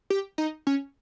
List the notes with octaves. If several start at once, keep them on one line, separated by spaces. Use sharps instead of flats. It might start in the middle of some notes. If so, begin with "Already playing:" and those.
G4
D#4
C#4